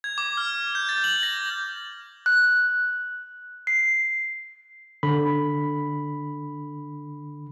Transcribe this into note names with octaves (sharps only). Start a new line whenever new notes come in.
G#6
D6
F6
G6
A6
F#7
A#6
F#6
C7
D3 B5